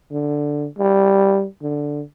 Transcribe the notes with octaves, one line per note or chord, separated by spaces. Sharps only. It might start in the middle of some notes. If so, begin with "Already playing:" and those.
D3
G3
D3